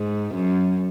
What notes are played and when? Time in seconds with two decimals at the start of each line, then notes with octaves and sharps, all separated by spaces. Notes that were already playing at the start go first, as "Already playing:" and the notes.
Already playing: G#2
0.35 F#2